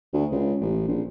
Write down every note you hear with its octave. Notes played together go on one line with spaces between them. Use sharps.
D2
C#2
A1
A#1